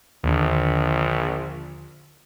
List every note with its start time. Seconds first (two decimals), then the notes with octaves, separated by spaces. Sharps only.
0.24 A#1 D#2 D3